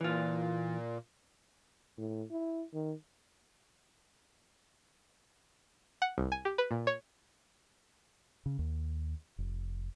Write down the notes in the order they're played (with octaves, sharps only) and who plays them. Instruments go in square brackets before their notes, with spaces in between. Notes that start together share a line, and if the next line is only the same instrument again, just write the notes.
[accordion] A#2 [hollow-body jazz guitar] E3 F4
[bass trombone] A2
E4
D#3
[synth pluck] F#5
C2
G#5
G4
B4
A#2
C#5
[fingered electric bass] C#3
D#2
F1